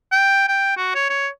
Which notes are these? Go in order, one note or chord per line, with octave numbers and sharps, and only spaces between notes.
G5
G5
F#4
C#5
C#5